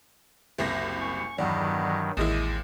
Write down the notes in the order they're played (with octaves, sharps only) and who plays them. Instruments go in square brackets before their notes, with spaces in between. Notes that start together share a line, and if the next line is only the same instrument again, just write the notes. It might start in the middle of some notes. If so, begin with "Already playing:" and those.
[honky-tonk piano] F#1 C2 A#6 [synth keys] E5
[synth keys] G#5 [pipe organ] C#6
[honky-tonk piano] E2 [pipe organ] G2 D#3 F#3 [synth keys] D5 F#5 B5
[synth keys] A1 E7 [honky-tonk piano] D#2 G#3 E4 [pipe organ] D#6